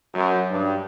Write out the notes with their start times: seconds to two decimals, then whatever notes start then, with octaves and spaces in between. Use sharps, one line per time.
0.14 F#2
0.50 G2